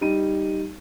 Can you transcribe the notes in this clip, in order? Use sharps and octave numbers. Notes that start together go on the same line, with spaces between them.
G3 D#4 D#7